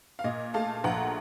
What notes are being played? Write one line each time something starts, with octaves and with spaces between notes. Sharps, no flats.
F5
A#2 D#5
A3 F5 A5
A#1 F#5 A#5